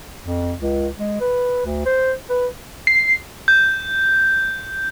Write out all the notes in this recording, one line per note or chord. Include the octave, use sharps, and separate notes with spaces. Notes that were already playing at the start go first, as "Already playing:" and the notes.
F2
C#2
G#3
B4
D2
C5
B4
C7
G6